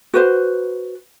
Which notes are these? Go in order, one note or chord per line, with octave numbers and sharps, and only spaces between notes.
F#4 B4 C5